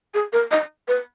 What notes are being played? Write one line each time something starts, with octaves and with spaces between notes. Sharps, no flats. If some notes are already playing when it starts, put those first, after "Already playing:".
G#4
A#4
D#5
B4